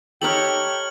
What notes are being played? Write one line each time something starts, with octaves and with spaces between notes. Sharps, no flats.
D#4 G4 A4 C#5 G5 F6 F#7